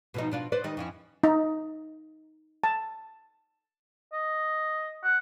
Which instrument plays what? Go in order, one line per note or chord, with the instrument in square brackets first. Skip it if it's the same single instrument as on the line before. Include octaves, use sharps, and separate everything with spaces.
[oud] B2 F3 D#4
B2 D4 F4
B4 C5 D5
D#3 G3 D#4
F2 C#4 E4
[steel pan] D#4
A5
[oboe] D#5
F#5